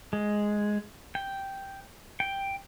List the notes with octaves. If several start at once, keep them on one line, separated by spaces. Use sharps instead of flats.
G#3
G5
G5